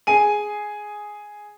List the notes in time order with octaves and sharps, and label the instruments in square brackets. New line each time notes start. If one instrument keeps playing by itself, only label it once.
[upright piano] G#4 G#5 D#7